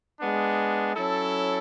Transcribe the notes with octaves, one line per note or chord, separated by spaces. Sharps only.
G#3 B3 D4
F#3 C#4 E4 A4